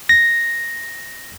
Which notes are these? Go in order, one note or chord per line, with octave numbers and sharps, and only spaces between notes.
A#6